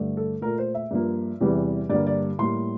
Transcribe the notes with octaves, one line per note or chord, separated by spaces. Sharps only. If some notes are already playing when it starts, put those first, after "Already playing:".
Already playing: G2 D3 A3
A4
A#2 A3 A#4
C5
E5
G2 F3 A#3
E2 C3 E3 G3
G2 D3 G3 A#3 D5
D5
A2 G3 A#3 C6